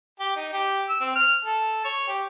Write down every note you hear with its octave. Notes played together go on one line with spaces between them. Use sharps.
G4
D#4
G4
E6
C4
F6
A4
C#5
G4